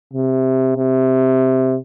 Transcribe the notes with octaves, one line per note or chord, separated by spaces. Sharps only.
C3
C3